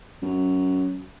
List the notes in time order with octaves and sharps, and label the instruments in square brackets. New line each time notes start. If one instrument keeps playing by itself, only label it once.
[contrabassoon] F#2